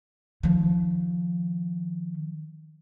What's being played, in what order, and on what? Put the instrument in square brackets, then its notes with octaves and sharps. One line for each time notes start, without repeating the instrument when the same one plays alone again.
[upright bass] D#3 F3